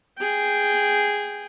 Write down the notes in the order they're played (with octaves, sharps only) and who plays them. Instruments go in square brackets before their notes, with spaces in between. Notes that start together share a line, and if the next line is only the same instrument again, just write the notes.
[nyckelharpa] G#4 G5